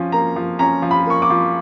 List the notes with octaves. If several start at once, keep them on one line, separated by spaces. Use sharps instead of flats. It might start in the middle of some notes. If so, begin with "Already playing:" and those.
Already playing: F3 C#4
A#3 A#5
F3
C#4 A#5
F3
B5
A#3 C#6
D6
F3